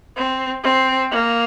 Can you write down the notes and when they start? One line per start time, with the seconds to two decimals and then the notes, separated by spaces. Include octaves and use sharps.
0.17 C4
0.64 C4
1.11 A#3